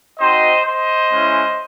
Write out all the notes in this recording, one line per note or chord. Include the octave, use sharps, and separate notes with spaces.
C4 D#4 F#4 C5 D#5
C5 D#5
G#3 C#4 E4